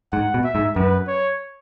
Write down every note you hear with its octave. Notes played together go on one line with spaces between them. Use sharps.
G#2 F#5
B2
E5
G#2
F#2 B4
C#5